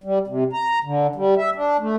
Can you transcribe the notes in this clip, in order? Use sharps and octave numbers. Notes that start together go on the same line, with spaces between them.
G3
C3
A#5
D3
G3
E5
D4
A3